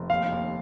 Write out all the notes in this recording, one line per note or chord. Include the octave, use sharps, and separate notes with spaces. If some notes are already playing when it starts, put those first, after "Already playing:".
Already playing: F1
D#2 F5
D#2